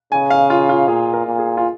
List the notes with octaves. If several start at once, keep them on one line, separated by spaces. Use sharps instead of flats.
C#3 G#5
F5
F4
F4
A#2 G#4
A#4
A#2
G#4
F4